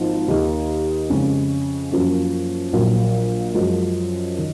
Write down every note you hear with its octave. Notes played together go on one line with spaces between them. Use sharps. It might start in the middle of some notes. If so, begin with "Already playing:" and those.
Already playing: G#1 G#2 F3 A#3
D#2 D#3 A#3 D#4
F2 C#3 G#3 C#4
F#2 F3 A#3 C#4
A#1 A#2 F#3
F#2 F3 G#3
D#3